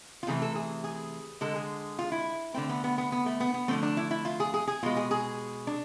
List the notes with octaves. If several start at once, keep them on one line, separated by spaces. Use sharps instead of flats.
F4
C3 E3 A3 G#4
A4
G#4
G#4
D3 G#3 A4
G#4
F4
E4
D3 A3 C4
B3
B3
B3
B3
A3
B3
B3
D3 F3 A3 C4
D4
E4
E4
F4
G#4
G#4
G#4
B2 G#3 F4
G#4
G#4
D4